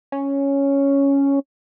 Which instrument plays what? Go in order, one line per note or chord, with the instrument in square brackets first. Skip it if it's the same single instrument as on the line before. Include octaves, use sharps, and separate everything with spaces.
[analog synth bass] C#4